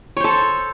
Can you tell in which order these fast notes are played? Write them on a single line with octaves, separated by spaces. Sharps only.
C#5 C5 A4